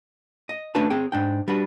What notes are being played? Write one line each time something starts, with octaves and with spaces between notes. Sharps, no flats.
D#5
A3 C#4 D4 F#4 B4 A5
C4 G#4 G5
G#2 D4 G5
G3 D4 F#4 B4